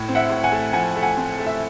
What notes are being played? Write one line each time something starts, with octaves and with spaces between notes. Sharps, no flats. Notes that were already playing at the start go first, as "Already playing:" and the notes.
Already playing: A2
C4
E5 F#5
A2
F#5 G#5
A3
F3 F#5 G#5
A3
F#5 G#5
C4
A3
E5